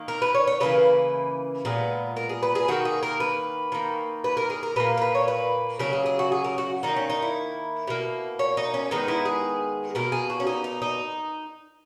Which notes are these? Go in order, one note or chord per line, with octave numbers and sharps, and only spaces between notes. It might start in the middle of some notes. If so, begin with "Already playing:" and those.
Already playing: D#3 A#3
A#4
B4
C#5
C#5
C#3 E3 A#3 B4
A#2 G#3 B3
A#4
G#4
B4
G#4
D#3 A#3 F#4
G#4
A#4
B4
D#3 A#3
B4
A#4
G#4
A#4
A#2 A#3 B4
A#4
B4
C#5
B4
C#3 F#3 A#3 A#4
G#4
G#4
F#4
G#4
A#4
F#4
D#3 A#3 D#4
C#4
D#4
E4
B2 A#3
C#5
D#4
C#4
D#3 G#3 B3 D#4
E4
G#4
B2 A#3 A#4
G#4
F#4
C#4
D#4
D#4
D#4